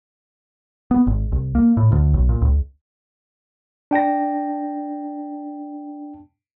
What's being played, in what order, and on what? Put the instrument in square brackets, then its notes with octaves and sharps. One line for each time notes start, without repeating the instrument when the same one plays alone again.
[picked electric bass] B3
G#1
C2
A#3
A2
D2
B1
A#2
C#2
[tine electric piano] D4 G5 A5 A#6